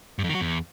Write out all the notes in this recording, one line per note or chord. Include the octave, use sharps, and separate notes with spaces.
G2
F2
D#3
F#3
E2